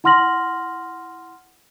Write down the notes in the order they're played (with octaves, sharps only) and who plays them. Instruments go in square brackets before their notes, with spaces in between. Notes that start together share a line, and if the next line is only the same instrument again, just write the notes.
[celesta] E4 F#5 C6 F6 A#6 F#7